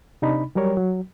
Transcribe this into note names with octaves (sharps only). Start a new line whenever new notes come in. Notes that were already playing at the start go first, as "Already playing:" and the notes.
C3 D4 D#4 B5
F#3 G3 G4 A#4 C#5
F#3